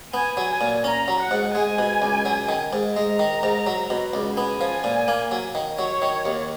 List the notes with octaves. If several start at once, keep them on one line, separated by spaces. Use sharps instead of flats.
B3 G#5
F#3
G#5
A#2
C#4 A#5
F#3
F#5
G#2
G#3 G#5
B2
C#2
F#3
D#3
G#2
G#3 A#5
D#3
G#2
F#3
B2
C#2
B3 G#5
F3
A#2
A#3
F#3
D#3
F#3 C#5
D#3
D#2